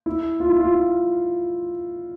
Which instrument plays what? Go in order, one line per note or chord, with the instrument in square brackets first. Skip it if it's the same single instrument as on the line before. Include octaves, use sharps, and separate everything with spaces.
[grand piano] E4
F4
E4
F4
F4